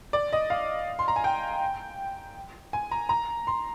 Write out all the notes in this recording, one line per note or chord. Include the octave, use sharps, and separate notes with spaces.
D5
D#5
F5
C6
A#5
G#5
G5
G#5
A#5
A#5
C6